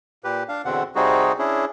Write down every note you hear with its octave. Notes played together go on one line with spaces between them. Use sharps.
A#2 G4 B4
D4 F5
E2 B2 D3 C4 F#5
C3 G3 C4 D#4 F#4 G#4
C#4 D4 E4 G#4